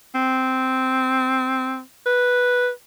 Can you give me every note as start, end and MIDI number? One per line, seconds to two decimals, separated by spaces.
0.15 1.80 60
2.06 2.69 71